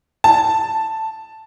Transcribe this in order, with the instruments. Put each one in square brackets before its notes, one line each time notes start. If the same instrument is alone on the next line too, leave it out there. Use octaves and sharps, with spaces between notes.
[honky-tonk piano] A5